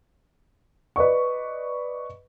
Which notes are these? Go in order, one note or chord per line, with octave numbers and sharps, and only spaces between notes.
B4 D5 D#5 C#6